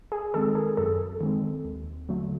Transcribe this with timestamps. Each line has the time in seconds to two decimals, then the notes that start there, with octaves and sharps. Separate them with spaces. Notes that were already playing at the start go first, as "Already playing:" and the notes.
0.12 G#4
0.34 D#3 G#3 C4 A4
0.55 G#4 A#4
0.77 F#2 A4
1.21 D#3 G#3 C4
1.65 D#2
2.09 D3 F#3 A3